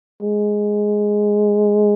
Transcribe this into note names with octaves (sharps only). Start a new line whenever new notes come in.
G#3